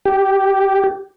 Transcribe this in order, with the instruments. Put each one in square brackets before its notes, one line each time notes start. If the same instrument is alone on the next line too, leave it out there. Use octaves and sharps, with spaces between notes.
[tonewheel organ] G4